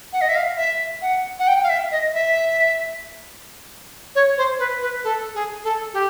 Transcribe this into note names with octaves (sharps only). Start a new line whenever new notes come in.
F#5
D#5
E5
F5
E5
F#5
F#5
G5
F5
E5
D#5
E5
C#5
C5
B4
B4
A4
G#4
A4
G4